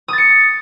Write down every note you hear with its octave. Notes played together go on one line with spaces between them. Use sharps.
D#6 A6 C#7